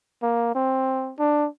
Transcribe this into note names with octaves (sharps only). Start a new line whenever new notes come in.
A#3
C4
D4